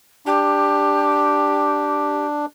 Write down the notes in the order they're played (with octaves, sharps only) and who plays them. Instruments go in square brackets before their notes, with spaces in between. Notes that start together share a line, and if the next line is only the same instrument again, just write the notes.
[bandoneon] D4 [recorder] G4